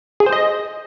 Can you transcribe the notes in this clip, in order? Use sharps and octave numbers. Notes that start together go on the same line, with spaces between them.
G#4
C5
D#5